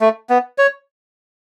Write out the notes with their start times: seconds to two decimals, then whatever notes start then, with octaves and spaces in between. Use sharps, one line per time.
0.01 A3
0.30 B3
0.58 C#5